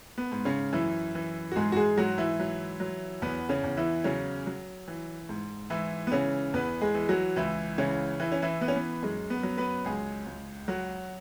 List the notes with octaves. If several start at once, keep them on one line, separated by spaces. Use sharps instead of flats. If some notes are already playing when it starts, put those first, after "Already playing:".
B3
G#2
C#3 C#4
F#2 E3 E4
E3
F#4
G#2 G#3 G#4
F#4
G#3 G#4
G#2 F#3 F#4
E3 E4
F#3
F#3
E2 B3
C#3 C#4
E2
E3 E4
C#3 F#3 C#4
F#3
E3
G#2
G#2 E3 E4
B3
C#3 E3 C#4
E2 B3 B4
G#3 G#4
E3
F#3 F#4
C#2 E3 E4
C#3 E3 C#4
E3 E4
C#4
E3 E4
E3 B3
C#4
B3
F#2 G#3
B3
F#3
B3 B4
C#2 G#3 G#4
C#2
F#3 F#4